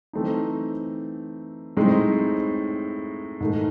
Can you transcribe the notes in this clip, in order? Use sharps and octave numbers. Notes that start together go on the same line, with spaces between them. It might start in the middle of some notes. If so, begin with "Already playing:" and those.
E3 A3 C4 D#4
A2 G#3 C4 D#4
G#2 D#3 A3